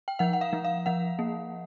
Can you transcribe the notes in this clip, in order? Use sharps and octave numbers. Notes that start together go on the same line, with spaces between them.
G5
F3 F#5
F#5
F5
F3
F5
F3 F#5
A#3